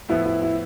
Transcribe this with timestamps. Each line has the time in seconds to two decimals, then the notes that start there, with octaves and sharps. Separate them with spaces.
0.09 A2 F3 B3 E4
0.26 E4
0.42 E4